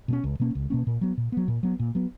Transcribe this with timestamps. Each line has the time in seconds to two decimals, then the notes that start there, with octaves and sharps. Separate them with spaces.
0.08 B2 A#3
0.13 C#4
0.24 C#2
0.40 B2 A#3 C#4
0.55 C#2
0.70 B2 A#3 C#4
0.87 A#2
1.01 F#3 B3
1.18 A#2
1.32 F#3 B3
1.48 A#2
1.63 F#3 B3
1.79 A#2
1.95 F#3 B3